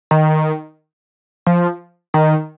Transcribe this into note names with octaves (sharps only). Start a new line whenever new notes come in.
D#3
F3
D#3